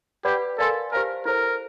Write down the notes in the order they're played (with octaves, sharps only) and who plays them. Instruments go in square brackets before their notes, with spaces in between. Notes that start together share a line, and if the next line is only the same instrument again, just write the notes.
[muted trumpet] G4 [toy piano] B4 D5 F#5 B5
[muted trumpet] A4 [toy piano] A#4 D5 F5 G#5 C6
[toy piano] G4 C5 F5 A5 [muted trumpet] A#4
[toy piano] E4 A4 C5 [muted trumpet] A#4